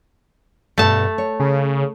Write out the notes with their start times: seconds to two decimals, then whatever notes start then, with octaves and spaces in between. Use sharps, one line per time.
0.78 G2 B2 A3 A5
1.18 C#5
1.40 C#3